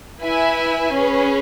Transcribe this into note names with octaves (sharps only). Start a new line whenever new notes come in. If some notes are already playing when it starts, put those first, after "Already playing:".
E4 B4 E5 G#5
C#4 G#4 B4